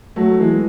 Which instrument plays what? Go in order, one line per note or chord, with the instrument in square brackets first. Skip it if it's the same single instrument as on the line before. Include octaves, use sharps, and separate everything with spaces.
[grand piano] F#3 A3
E3 G#3